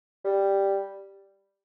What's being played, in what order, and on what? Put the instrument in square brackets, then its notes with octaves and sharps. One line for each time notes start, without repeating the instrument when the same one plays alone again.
[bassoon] G3